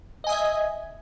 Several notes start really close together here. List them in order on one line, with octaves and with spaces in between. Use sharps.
D#5 G#5 D#6 E5 G#6